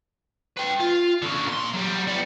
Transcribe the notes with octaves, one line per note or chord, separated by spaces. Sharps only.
B4 G5
F4
D3 C#4
A#2 C6
F#3 G3
G3 B3